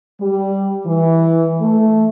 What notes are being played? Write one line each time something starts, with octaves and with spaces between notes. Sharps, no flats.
G3
E3
A3